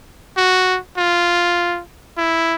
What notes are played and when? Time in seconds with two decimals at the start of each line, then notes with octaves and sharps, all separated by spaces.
0.37 F#4
0.97 F4
2.17 E4